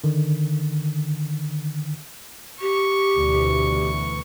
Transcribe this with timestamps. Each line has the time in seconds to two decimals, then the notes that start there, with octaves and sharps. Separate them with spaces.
0.04 D3 D#3
2.61 G4 C#6
3.18 D2 B2 E3